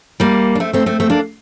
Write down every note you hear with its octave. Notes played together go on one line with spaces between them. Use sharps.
G3 A#3
D4
A3 C4
A3 C4
A3 C4
A3 C4
A#3 D4